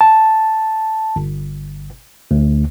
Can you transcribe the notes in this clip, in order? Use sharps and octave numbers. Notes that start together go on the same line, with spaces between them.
A5
G1
D2